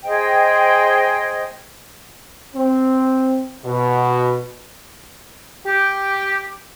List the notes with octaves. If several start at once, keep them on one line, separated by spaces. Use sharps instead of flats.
G#4 C5 D#5 G5
C4
B2
G4